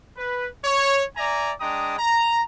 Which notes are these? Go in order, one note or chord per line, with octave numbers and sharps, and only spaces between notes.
B4
C#5
D5 E5 G#5 A#5
G#3 D4 G5 A#5 D#6
A#5